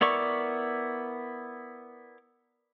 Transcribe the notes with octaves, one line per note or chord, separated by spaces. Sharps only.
B3 E4 A#4 D5 C#6